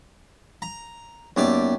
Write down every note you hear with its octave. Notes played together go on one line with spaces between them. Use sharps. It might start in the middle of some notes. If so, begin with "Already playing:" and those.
A#5
F#2 A#3 B3 D#4 G4 D5